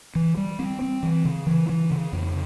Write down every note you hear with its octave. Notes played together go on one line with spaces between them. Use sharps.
E3
G3
C4
C4
E3
C#3
E3
E3
C#3
F2